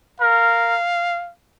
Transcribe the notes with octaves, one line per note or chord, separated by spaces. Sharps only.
A#4 F5